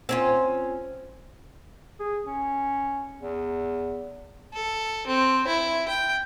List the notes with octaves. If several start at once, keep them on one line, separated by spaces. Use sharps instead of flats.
C4 C#4 F4
G#4
C#4
E2
A4
C4
E4
G5